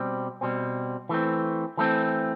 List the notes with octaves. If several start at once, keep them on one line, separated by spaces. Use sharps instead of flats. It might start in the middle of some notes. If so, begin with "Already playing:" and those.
Already playing: B2 G3 C4
B2 G3 C4
E3 A3 C4
E3 A3 C4